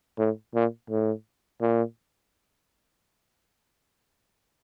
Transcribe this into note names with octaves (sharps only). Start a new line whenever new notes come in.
A2
A#2
A2
A#2